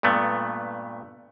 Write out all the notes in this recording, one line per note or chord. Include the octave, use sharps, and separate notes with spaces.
G2 A#2 A3 B3